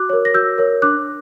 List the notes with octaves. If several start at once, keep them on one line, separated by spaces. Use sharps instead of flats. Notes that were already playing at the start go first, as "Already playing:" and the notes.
Already playing: F#4 D6 F#6
A#4 C#5
A#6
F#4 E6 G6
A#4 C#5
D4 D6 F#6